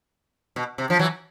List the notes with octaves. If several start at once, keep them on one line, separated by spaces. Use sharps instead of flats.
B2
C3
F3
E3 F#3